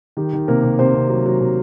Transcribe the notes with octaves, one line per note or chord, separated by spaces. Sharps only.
D#3 G4
D#3
C3 A#3 A#4
C3
C3 C4 C5
C3
F#3
F#3
C3